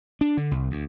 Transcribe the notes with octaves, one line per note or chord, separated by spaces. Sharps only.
D4
D3
C2
D2